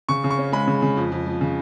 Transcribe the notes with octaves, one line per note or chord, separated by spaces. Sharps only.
C#3 C#6
C#3
C#6
C#4
G#3 B5
C#3
C#3
F2
F2
F3
C#3